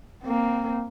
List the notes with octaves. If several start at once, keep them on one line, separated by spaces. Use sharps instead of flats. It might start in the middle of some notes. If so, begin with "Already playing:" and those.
A#3 C4